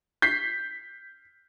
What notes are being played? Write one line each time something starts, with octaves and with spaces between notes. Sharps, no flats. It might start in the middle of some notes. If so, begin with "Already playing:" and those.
G6 B6 C7